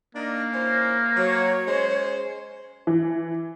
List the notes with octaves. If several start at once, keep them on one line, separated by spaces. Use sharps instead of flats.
A#3 D4 D#4
C#4 E4 C5
F#3 C#5
G#3 C#4 C5
E3